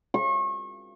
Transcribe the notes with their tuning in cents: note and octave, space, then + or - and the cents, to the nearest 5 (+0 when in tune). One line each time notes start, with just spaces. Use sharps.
C#6 -35